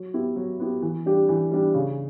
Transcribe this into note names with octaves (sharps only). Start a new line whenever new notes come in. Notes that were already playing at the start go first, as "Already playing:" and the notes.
Already playing: F#3
B3 E4 G4
F#3
B3 E4 G4
E3
G3 D4 G4
E3
G3 D4 G4
C#3